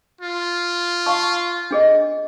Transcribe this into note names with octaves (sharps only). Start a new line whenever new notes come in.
F4
F5 A5 C#6
D4 G#4 D#5